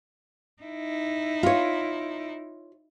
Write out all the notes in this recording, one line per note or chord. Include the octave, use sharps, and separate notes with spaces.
D#4 E4
F4 C#5